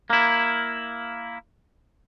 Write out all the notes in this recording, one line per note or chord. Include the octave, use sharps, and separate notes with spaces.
A#3 E4